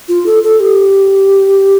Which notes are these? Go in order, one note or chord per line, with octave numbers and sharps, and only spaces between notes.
F4
A4
A4
G4